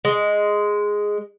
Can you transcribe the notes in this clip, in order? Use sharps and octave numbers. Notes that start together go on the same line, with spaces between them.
G#3